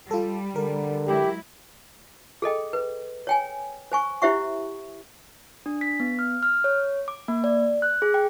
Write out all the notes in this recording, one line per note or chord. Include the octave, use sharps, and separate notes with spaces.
G3 F4 A4
D3 A#4
F#3 G#3 E4 G4
G#4 A4 D#5 G5
B4
C#5 G5 G#5
C5 G#5 C#6
E4 G4 C5 E5 F#5 C#6
D4
B6
B3
F6
F6
C#5
D6
A#3
D5
F#6
G#4
G5